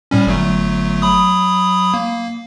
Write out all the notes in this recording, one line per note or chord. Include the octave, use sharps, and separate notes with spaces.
A2 G3 C#4
G1 F#3 A3
F#3 B5 D#6
A#3